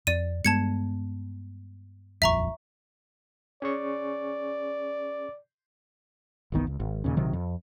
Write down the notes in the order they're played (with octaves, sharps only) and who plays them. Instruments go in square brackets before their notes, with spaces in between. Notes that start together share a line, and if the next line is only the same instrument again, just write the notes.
[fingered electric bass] F2 [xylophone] D5 D#7
[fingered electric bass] G2 G#3 B3 [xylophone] A5 G#6 C#7
[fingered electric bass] D#1 A#1 F2 [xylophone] E5 A#5 C#6
[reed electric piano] C#4 G#4 C#6 [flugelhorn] D5
[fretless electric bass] G1 C2 D#3 B3
C#2
G#1
D#2 A#2 C#3
A#1 C3 D#3 F#3
F2